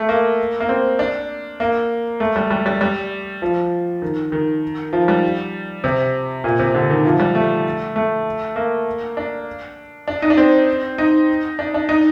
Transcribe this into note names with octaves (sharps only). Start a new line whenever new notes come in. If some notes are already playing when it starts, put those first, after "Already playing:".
Already playing: A3
A#3
A#3
C4
D4
A#3
A3
G3
G3
G3
G3
F3
D#3
D#3
F3
G3
C3
A#2
C3
D3
D#3
F3
G3
A3
A3
A#3
D4
D4
D#4
D4
C4
D#4
D4
D4
D#4